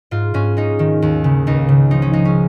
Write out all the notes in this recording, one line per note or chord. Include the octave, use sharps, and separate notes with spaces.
G#2 F4
G#2 C#4
G#3 D#4
D#3
D#2
C#3
C#2 D#4
C#3
F3 D#4
C#4
G#3 D#4
C#4